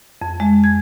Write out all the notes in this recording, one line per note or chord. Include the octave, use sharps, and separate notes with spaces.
F2
G#3
G#6